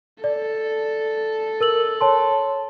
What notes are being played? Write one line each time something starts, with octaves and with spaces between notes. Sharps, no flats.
A4 D5
A#4 E6 F#7
C#5 A5 C6